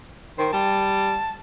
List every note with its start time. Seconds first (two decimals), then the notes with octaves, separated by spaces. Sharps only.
0.38 D#3 C5
0.53 G3 A5